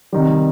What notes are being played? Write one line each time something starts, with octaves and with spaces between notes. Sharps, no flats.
C3 D#3 G3